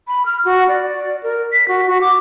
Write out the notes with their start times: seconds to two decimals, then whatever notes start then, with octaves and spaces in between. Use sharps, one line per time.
0.08 B5
0.26 F6
0.45 F#4
0.68 D5
1.23 A#4
1.53 B6
1.68 F#4
1.87 F#4
2.01 D6